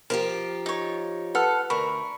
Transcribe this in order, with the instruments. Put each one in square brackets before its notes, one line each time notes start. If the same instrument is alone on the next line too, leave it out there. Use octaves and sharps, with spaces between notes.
[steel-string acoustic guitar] F3 F4 G4 [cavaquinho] A#4
[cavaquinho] D#4 C#5
[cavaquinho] A4 [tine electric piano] B4 F#5 F6
[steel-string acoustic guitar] D2 [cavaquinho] A#4 [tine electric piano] B5 C#6